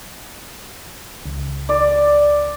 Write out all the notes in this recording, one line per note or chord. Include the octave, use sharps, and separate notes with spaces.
C#2
D5